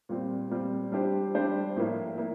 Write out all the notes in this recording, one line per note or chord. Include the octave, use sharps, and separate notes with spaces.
A#2 G3 C4
A#2 G3 C4
G3 D4 G4 C5
G3 D4 G4 C5
A2 F3 A#3 E4
A#3 E4